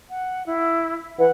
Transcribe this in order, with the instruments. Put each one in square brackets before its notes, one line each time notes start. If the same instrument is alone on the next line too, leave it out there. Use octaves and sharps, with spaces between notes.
[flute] F#5
E4
[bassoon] E3 [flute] F#5